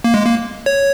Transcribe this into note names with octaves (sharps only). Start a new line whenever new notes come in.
A#3
G#3
A#3
C#5